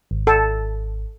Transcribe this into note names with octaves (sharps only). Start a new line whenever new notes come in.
G#1
A4